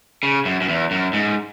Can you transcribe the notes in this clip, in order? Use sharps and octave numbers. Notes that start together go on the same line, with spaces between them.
C#3
F#2
F#2
E2
F#2
G#2